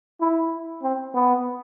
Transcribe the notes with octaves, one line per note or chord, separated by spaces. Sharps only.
E4
C4
B3